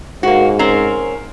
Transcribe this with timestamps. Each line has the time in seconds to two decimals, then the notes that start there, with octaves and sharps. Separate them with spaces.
0.23 G#2 A#3 F#4
0.59 C4 C#4 A#4